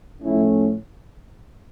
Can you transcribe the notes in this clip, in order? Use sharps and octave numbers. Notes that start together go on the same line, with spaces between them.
A2 F3 A3 C#4 E4